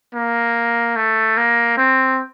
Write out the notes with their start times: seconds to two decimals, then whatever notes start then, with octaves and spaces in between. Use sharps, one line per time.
0.15 A#3
0.96 A3
1.38 A#3
1.77 C4